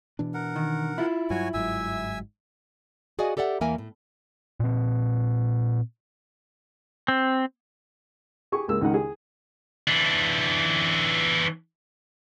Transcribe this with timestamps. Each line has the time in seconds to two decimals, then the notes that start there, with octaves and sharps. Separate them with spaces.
0.19 B2 E3 D4
0.34 A#4 F#5
0.56 D#3
0.98 E4 F4
1.30 G2 F#3 F#4 C#5 G#5
1.54 G1 G#2 F#3 E5 G#5 E6
3.19 F#4 G#4 D5 D#5 F5 G#5
3.37 G4 A4 D5 E5 F#5
3.61 E2 E3 A#3 A#4 E5 G#5
3.78 A2
4.60 A#2 C4
7.08 C4
8.52 G4 G#4 C#6
8.68 C#2 G#3 A#3 E6
8.81 C#2 D#3 G#3 D#4 A#4 F#5
8.94 G#4
9.88 E3 D4